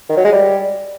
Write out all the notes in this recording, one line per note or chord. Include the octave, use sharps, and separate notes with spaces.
D#3
F#3
G#3
G3